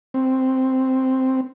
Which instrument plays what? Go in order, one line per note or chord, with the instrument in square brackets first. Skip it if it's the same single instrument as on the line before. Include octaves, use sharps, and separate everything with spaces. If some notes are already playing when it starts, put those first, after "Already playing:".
[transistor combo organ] C4